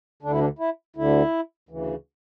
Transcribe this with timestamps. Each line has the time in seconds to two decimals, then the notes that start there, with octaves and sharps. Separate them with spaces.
0.22 D2 D3 D4
0.31 E4
0.40 D4
0.59 E4
0.96 D2 D3 E4
1.69 D2 C#3 E3